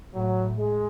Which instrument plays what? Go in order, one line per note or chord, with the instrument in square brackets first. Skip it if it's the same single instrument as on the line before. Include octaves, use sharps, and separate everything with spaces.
[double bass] A2 [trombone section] F#3
[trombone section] G#3